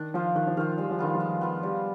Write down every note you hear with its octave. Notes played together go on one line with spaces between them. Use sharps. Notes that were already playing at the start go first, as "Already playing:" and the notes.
Already playing: D#3 D4
F3 F4 C5 F5
D#3 D4
F3
D#3 F4 C5 F5
G3 G#3
F3
D#3 B3 F4
F3
G#3
B3 F4
F3 G3